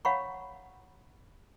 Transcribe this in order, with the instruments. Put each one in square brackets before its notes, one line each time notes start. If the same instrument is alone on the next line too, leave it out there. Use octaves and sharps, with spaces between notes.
[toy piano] C#5 F5 F#5 A#5 B5 C#6